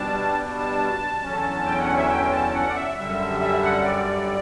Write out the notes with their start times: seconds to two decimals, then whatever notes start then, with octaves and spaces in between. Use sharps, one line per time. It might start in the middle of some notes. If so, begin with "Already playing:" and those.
Already playing: B2 G3 D4 A5
0.59 A5
1.23 E2 D3 F#3 C#4
1.66 G5
1.81 F#5
1.96 E5
2.10 G5
2.32 A5
2.54 F#5
2.69 D5
2.76 E5
2.97 F#2 D3 G3 E5
3.40 E5
3.63 F#5
3.84 D5